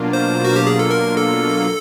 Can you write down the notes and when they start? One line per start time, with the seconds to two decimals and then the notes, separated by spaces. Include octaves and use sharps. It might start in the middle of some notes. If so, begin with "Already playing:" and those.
Already playing: B2 F#3 A#3 D4 F4
0.13 C5
0.44 F#4
0.56 G4
0.67 G#4
0.79 A4
0.91 A#4
1.17 A4